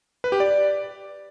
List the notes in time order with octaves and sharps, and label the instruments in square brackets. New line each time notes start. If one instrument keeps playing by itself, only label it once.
[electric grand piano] B4
G4
D5